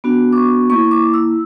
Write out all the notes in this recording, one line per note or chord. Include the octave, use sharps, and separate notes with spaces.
B3 D4 F#4
D6
C#6
A#3 E4 C#6
C#6
D6
E6